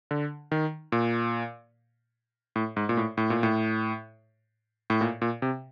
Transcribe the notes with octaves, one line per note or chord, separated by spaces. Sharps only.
D3
D#3
A#2
A2
G#2
A#2
A2
A2
A#2
A2
A2
A#2
A#2
C3